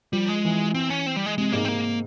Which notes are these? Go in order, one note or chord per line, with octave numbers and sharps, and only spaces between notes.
F3 G3
G#3
E3
C4
C#4
C4
G3
G#3
C3 G#3
G#2 A#3
C4
A#3